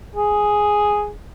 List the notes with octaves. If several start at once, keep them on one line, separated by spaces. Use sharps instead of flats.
G#4